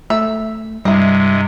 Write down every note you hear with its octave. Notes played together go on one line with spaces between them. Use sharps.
A3 E5
G2 C3 G3 G#3 E4 D#5